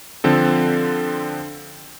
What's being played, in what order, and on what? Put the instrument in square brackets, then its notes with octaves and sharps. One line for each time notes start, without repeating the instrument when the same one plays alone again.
[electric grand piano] D3 F3 C4 A4